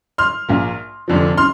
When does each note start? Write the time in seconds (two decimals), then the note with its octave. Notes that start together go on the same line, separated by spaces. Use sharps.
0.18 C6 F6
0.48 A#1 A#2 A#3
1.08 F1 F2 D3 F3
1.37 C6 F6